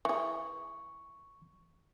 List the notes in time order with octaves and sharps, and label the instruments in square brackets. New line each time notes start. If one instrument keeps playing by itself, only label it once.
[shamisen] E3 G#4 [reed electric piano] C#6